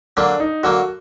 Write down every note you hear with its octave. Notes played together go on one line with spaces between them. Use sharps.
D3 F#3 A#3 D4
D#4
D3 F#3 A#3 F#4